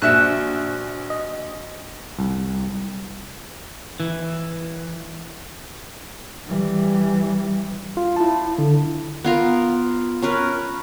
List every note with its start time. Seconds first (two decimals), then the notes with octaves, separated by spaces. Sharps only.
0.02 A#1 F#4 E5 F#6
1.10 D#5
2.19 C2
4.00 E3
6.48 E3 G3
7.97 F4
8.16 E4 A5
8.58 D3
9.24 B3 F4 A#4
10.22 C#4 A#4 B4